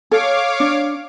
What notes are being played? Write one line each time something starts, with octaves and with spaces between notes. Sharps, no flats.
A4 C#5 F5 D6
D4